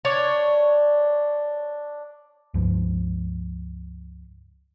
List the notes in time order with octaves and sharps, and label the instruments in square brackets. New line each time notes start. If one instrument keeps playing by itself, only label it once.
[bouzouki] D4 C#5
[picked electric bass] C#2 G2 F3